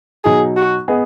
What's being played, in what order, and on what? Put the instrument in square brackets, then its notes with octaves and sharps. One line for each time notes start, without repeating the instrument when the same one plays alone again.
[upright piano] B2 F#3 D#4 [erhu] G#4
[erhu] F#4
[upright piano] B3 G#4 D#5